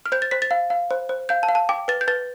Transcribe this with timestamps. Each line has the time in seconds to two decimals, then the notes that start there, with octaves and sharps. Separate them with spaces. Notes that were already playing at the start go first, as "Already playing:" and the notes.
0.06 F6
0.12 C5 G6
0.22 A6
0.31 C5 B6
0.42 A6
0.51 F5
0.70 F5
0.91 C5
1.09 C5
1.29 F5 G6
1.43 A5
1.49 F5
1.55 A5
1.69 G5 D6
1.88 B4 A6
2.01 G6
2.08 B4 A6